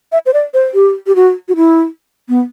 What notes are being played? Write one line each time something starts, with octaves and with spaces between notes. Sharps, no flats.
E5
C5
D5
C5
G4
G4
F#4
F#4
E4
B3